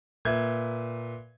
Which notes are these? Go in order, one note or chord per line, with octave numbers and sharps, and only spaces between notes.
A#2 B4 E5 G#6